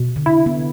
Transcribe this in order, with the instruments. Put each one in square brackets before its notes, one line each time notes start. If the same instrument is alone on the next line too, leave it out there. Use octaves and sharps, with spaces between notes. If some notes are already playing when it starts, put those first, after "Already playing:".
Already playing: [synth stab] B2
[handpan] D3
[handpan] C3 [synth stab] E4
[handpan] B3